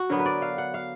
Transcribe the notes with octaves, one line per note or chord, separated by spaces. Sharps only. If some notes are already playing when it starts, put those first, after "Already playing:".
Already playing: F#4
D3 F#3 B3 A#4
B4
D5
F5
F#5
F5